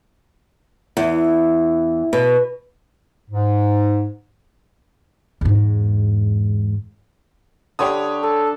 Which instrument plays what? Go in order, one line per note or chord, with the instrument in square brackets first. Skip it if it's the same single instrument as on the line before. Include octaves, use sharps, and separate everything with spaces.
[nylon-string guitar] E2
B2
[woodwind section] G#2
[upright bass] E2 G#2
[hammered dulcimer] D3 D4 B5 [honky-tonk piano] G4 C#5 D#6
[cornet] A4 [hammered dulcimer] A5